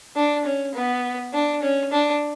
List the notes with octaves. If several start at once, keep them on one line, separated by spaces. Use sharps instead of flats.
D4
C#4
B3
D4
C#4
D4